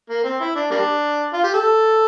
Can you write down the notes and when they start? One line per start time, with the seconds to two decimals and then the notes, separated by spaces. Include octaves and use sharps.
0.09 A#3
0.24 C4
0.40 E4
0.55 D4
0.71 G3 A#3 D4
1.33 F4
1.44 G4
1.54 A4